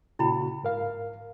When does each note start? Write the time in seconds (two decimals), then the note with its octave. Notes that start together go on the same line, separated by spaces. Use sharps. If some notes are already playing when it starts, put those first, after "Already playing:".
0.19 A#2 C#3 E4 F#4 G5 B5
0.63 G#2 A#4 F5